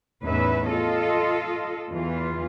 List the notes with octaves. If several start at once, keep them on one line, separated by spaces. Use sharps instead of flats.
E2 A2 C#4 D#4 B4 E5
F4 A4 D#5
E2 E3 F4